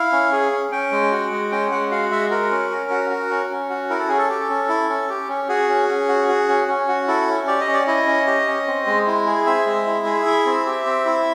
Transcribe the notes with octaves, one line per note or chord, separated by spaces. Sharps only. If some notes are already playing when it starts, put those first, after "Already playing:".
Already playing: E4 F5
C#4
G#4
C#4
C#4 G5
G#3
F#4
G#3
C#4 G5
G#3 F#5
F#4 F5
G#3 E5
F#4 A#4
C#4
C#4
F#4
F#4
C#4
C#4
F#4
E4 A#4
A4
C#4 G#4
A4
G4
C#4
E4
C#4
G4
C#4
F#4 G#4
C#4
C#4
F#4
F#4
C#4
C#4
F#4
E4 A4
C#4
G4 D5
D#5
C#4
D5
E4 D#5
C#4
G4
C#4
C4
G#3
E4
G#4
C4 E5
G#3
E4
G#4
E4
C4
G4
C4
E4